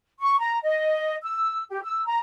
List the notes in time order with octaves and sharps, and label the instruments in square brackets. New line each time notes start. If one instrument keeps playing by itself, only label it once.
[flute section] C#6
A#5
D#5
E6
G4
E6
A#5